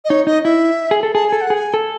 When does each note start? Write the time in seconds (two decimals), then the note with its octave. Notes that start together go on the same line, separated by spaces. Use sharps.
0.05 D#5
0.10 D#4 C#5
0.27 D#4 D#5
0.44 E4 E5
0.91 G#4
1.03 A4
1.15 G#4 A5
1.28 A4 G#5
1.41 F#5
1.50 G#4
1.54 G#5
1.74 A4